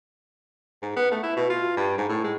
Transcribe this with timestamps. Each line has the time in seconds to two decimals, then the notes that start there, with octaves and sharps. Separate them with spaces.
0.83 G#2
0.97 B3
1.12 A3
1.24 E4
1.37 B2
1.50 F4
1.77 G2
1.98 G#2
2.10 A2
2.24 G#3